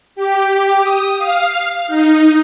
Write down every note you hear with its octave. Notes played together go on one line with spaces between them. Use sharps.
G4
D#6
F5
D#4